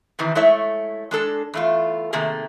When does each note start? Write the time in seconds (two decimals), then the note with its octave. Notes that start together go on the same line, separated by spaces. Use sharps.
0.19 C3 D#3 E3
0.35 G#3 A3 E4 C#5 E5
1.11 G#3 D4 A4
1.54 E2 A3 F4
2.13 C3 D#3 A3 A#3 G#4